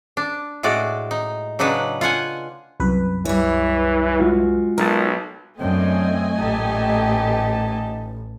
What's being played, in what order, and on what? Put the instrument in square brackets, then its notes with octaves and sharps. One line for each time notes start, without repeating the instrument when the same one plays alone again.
[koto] D4
A2 G#3 F#4 D5
D#4
C#3 F#3 D4 D#4 B4
F4 F5 F#5 G#5
[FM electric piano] C2 F#2 B4
[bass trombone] E3 [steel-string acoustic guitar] G3 C#5
[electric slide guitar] G#3 F4 F#4
[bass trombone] B1 [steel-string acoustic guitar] D#4 [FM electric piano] A#4 A5
[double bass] F#2 [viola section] A3 D#5 G#5 [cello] C4 [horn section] D4 G5
[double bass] A1 [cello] A#2 G4 [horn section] D#4 A5